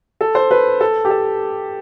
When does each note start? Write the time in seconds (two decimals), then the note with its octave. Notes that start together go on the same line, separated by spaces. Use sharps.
0.21 A4
0.35 C5
0.51 B4
0.81 A4
1.05 G4
1.10 A4